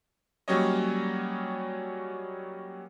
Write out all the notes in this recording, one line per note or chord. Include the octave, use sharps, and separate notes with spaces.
F#3 G3 A#3 C#4 C#5 D#5